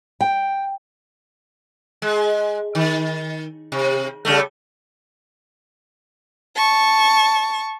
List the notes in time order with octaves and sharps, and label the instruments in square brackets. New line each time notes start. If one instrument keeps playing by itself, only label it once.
[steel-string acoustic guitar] G5
[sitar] G#3
D#3
C3
C#3 G3 A3
[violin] A5 C#6